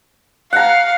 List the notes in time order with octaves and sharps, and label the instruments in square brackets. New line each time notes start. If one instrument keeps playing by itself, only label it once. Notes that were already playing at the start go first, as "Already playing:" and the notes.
[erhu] F5 [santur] F#5 A#5